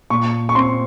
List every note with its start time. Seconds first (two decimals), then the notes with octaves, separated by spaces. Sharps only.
0.10 A#2 C#6
0.49 C#6
0.55 C4 C6